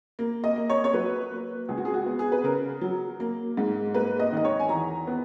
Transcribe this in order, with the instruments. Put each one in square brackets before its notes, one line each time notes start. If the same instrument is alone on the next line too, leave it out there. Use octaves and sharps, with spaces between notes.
[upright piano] A#3
D#5
A#3
C#5
C#5
F#3 B4
A#3
C#2 G#4
F#4
G#4
F#4
B3
G#4
B4
C#3 A#4
F#3
A#3
G#2
A#3 B4
D#5
D#3 D#5
C#5
G#5
E2 A#5
B3